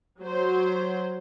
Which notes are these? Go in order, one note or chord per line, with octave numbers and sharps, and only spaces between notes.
F#3 C5